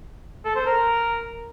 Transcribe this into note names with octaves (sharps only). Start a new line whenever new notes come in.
A4
C5
A#4